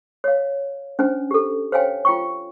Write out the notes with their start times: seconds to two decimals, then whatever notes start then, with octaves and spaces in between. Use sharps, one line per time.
0.24 C#5 F5
0.99 C#4 D4 C5 G#5
1.31 G4 A4
1.72 C5 C#5 F5 G5 G#5
2.05 F4 G5 C#6